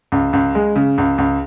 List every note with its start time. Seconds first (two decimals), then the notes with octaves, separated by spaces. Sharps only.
0.12 C#2
0.33 C#2
0.55 G#3
0.76 C#3
0.98 C#2
1.18 C#2